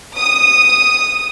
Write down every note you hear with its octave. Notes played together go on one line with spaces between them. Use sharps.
D#6